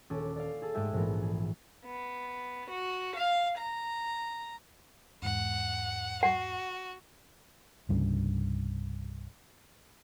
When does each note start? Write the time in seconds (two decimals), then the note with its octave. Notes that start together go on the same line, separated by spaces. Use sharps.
0.10 D#1 C#4 A4 D6
0.36 D5 F5
0.62 G#4 A4
0.74 G#2 G#3 A3 G4 E5 G#5
0.93 A#1 G#2 E3 B3 A#4
1.22 G#4
1.85 B3
2.70 F#4
3.16 F5
3.57 A#5
5.22 E2 G#2 F#5
6.23 F#4 F#5
7.89 C2 G2 C#3